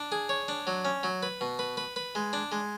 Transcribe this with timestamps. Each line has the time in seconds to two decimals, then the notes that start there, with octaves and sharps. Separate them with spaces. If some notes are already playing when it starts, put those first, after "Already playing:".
Already playing: D4
0.12 G#4
0.29 C#5
0.48 D4
0.67 F#3
0.85 C#4
1.03 F#3
1.23 B4
1.41 B2
1.59 B4
1.77 B4
1.96 B4
2.15 G#3
2.33 D4
2.52 G#3